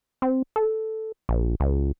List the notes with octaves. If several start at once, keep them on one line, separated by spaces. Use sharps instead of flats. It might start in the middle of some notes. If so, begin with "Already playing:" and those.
C4
A4
A#1
C#2